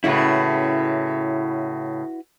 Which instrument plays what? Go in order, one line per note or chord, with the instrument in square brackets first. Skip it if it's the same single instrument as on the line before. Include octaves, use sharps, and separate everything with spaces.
[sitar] A2 C#3 [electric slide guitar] E4 F#4 B4